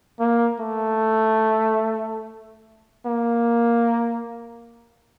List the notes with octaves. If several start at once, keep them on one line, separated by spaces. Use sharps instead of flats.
A#3
A3
A#3